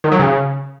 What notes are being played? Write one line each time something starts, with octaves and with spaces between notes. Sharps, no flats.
D#3
F#3
C#3